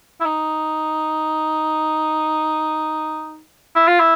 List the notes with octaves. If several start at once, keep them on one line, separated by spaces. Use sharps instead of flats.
E4
D#4
E4
F4
E4